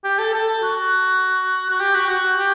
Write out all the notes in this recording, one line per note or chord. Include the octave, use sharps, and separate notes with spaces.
G4
A4
A4
F#4
F#4
G4
F#4
F#4
G4